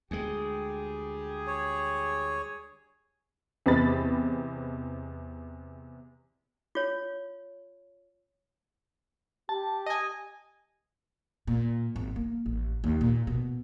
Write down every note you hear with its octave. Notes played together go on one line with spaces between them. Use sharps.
D2 G3 G#3 G4 G#4
C#5
E2 C3 D#5 B5 A6
F4 C#5
G4 A5
D#5 G#5
A#2
G#1
A#3
A1
D#2
A#2
B2